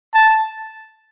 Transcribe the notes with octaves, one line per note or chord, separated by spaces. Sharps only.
A5